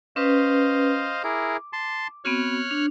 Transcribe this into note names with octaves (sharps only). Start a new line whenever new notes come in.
C#4 B4 C5 D#5 F5
E4 G#4 A#4 D6
A5 C6
B3 C4 F#4 C#5 F6 F#6
D4